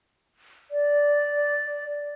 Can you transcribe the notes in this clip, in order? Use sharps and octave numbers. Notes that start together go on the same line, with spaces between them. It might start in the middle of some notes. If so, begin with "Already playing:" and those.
D5